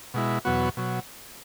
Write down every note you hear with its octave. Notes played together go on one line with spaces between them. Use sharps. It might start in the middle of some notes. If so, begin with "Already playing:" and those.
B2 G#3 E4
E2 B2 F#3 B3 F#4
B2 F#3